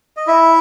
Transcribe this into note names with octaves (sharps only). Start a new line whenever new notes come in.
D#5
E4 E5